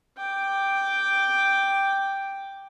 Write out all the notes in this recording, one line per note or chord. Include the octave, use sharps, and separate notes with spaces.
G5 D6